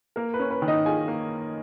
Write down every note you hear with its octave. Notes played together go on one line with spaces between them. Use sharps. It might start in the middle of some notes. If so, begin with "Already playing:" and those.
A#3 A#4
B4
C#4
B4
D#3
D#4 D#5
F4 G#4 G#5
A#3